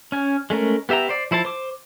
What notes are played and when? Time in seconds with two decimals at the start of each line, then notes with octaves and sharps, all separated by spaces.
0.12 C#4 G#5
0.50 G#3 A3 C#4 A#4
0.89 B3 G4 E5 G5 A#5
1.09 C5 D5
1.31 F3 E4 C5 A5
1.45 C5 D6